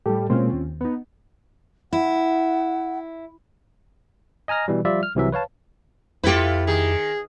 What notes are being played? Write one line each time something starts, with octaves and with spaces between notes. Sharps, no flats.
A2 G3 G4 A4
B2 G#3 A#3 C4 C#4 F4
D#2
B3 D#4
E4 F#5
D#5 G#5 A#5 F6 A#6
B2 E3 G3
F3 G3 F4 D5 E5
F6
C2 C3 E3 F#3 E5
B4 C#5 F5 A5
F2 E4 F4 G4 A4 B4
D#3 G#4